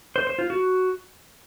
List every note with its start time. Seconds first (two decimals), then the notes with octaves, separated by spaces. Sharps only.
0.16 C5
0.27 C5
0.39 F4
0.50 F#4